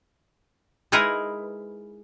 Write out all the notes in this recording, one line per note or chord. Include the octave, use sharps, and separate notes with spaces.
G#3 D#4 E4 G#4 A#4 B4